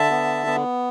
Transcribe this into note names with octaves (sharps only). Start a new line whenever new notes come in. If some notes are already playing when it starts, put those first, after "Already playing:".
Already playing: D3 E5 A5
B3
B3